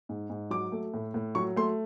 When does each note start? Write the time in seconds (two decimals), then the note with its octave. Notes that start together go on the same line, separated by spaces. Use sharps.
0.09 G#2
0.30 G#2
0.50 F#3 D6
0.72 A3
0.94 A2
1.14 A2
1.35 F#3 C#6
1.56 A3 C6